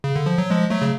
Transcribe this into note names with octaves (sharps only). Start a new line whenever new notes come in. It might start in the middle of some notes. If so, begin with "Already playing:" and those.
C#3
D3
F3
F#3
F3 G#3
F#3 A3
C#3